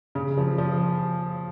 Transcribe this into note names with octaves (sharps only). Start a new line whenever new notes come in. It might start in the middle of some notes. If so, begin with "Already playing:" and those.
C#3
F3
F3